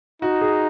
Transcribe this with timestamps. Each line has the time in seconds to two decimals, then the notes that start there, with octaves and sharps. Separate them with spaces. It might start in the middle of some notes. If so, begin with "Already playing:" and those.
0.22 D#4 F#4
0.41 G#4